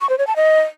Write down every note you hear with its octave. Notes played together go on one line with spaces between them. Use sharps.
C#6
C5
C#5
A5
D#5